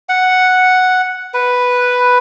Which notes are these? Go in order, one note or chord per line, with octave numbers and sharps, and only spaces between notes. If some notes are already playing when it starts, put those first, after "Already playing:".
F#5
B4